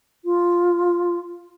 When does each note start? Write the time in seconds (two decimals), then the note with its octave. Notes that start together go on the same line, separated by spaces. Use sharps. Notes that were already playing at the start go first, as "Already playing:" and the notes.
0.25 F4